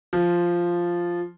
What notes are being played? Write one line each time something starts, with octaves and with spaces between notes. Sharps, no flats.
F3